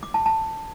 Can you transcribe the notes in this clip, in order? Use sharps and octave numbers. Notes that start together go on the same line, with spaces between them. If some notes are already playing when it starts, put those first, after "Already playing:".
D6
A5
A5